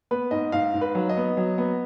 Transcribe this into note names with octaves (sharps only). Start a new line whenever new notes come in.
B3 B4
G#2 D#5
G#2 F5
G#2
B4
F#3
D#5
B3
F#3
B3